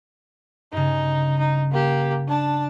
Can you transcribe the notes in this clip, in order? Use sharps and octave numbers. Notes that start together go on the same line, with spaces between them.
G2 C#3 D#4
D#4
A#3 G4
D4 A5